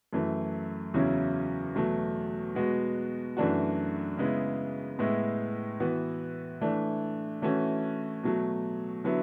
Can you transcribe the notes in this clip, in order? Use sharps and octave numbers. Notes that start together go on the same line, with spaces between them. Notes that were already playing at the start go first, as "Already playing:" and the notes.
F#2 E3 A3
E2 C#3 F#3 C#4 E4
E2 B2 F#3 A3
B2 G#3 B3 F#4
F#2 E3 A3 D4 F#4
C#3 G#3 B3 E4
A2 G#3 B3 E4
E3 B3 F#4
E3 A3 D4
E3 A3 C#4 F#4
B2 F#3 A3
D3 F#3 B3 E4